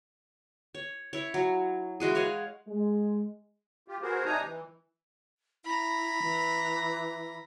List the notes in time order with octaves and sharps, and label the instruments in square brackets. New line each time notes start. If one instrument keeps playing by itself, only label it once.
[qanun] C#5
E4 C#5
F#3
E3 G#3 F#4 G#4
G#4 C#5 F5 F#5
[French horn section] G#3
[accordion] F4 G4
B3 F#4 G#4 A#4 C5
C3 D4 D#4 G#5 A#5 D#6
E3
[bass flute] E4 [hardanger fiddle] A#5 B5
[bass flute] E3